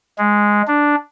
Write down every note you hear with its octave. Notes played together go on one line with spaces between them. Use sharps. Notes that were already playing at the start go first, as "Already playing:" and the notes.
G#3
D4